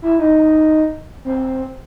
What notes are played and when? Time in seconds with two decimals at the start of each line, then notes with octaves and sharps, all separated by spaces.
0.02 E4
0.19 D#4
1.25 C4